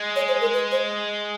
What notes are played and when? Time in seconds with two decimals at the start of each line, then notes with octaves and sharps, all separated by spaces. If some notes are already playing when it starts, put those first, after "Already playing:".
Already playing: G#3
0.16 C#5
0.28 C5
0.41 A#4
0.53 B4
0.72 C5